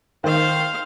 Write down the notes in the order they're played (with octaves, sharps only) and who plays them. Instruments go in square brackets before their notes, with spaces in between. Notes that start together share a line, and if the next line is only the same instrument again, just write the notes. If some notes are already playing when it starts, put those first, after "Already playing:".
[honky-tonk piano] D#3 [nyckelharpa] C5 F5